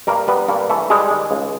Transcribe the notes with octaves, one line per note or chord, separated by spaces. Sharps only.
G2 A#3 A#4
G3 B3 B4
G2 A#3 A#4
E3 A3 A4
G3 G#3 G#4
D#3
C#2